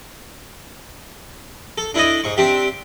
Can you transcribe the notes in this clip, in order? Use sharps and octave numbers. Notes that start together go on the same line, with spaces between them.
A4
D4 E4 A4 D#5
G#2 C#6
C4 D4 G4 E5